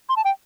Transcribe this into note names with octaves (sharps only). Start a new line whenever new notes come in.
C6
A5
G5